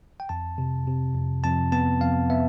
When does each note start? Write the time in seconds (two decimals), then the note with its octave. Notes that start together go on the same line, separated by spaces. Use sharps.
0.20 G5
0.29 F2 A5
0.58 C3
0.87 C3
1.15 F2
1.44 F2 A5
1.72 B3 A5
2.01 F2 F5
2.30 B3 E5